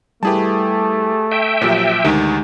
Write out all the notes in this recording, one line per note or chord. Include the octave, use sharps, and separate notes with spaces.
G3 A3 E4 G4 G#4 B4 A5
E5 G5
A#2 F3 F#3 G4 C5 C#5
D2 D#3 G#3 D#4 G4